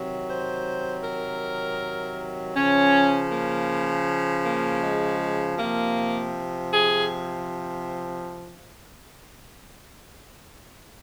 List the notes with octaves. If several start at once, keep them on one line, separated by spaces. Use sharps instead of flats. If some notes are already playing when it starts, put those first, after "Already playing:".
Already playing: C3 D#3 F#3
C5
A#4
C#3 F3 C#4
A#3
A#3
G#3
C3 F3 A#3
G#4